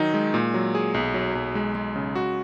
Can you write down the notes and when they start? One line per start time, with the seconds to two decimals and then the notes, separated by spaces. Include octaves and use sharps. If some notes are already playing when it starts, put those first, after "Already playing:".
Already playing: D#3 F#3 D#4
0.14 G#3
0.34 A#2
0.54 F#3
0.75 G#4
0.94 B1
1.14 F#3
1.35 B1
1.55 G#3
1.75 G#3
1.96 C#3
2.15 F#4